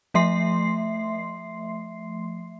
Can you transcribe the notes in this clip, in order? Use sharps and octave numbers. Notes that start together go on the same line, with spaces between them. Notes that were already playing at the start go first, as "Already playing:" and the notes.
F3 A3 E5 C6 C7